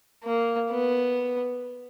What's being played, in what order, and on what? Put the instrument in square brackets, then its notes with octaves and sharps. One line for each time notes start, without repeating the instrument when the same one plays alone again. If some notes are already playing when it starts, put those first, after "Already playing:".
[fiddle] A#3
B3